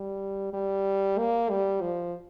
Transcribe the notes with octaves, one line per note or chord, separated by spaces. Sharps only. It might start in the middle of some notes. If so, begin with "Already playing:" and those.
Already playing: G3
G3
A#3
G3
F3